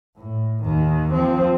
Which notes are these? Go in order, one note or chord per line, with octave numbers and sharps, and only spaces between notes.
A2
D#2 D#3
F3 C4